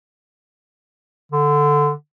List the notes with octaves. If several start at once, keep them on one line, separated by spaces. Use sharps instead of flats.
D3